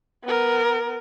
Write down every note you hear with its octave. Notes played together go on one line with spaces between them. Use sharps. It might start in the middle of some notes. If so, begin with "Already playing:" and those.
B3 A#4